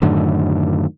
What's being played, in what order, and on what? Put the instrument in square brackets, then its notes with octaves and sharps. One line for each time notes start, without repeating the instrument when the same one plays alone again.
[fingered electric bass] F#2 A2 D3 D#3